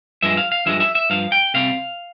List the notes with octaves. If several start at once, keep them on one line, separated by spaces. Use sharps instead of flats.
G2 F3 G#3 E5
F5
F5
G2 F3 G#3 E5
E5
E5
G2 F3 F5
G5
C3 G3 C4 F5